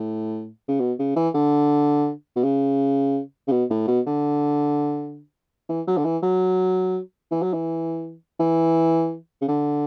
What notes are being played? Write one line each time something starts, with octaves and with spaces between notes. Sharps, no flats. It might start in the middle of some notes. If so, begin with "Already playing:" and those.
Already playing: A2
C#3
B2
C#3
E3
D3
B2
C#3
C#3
B2
A2
B2
D3
E3
F#3
D3
E3
F#3
E3
F#3
E3
E3
C#3
D3